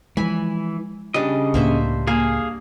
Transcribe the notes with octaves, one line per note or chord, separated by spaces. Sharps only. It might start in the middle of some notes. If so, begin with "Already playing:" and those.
E3 F3 G#3 G#5 B5
C#3 G3 D4 D#5
C#2 A2 A#3 D4 C5 E5
A#3 G#4 F5 G#5